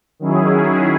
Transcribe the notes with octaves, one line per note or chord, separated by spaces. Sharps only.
D#3 F#3 C#4 E4 G#4